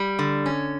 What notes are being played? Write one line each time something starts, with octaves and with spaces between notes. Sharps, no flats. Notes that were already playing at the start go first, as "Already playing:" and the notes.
Already playing: G3
D3
C#4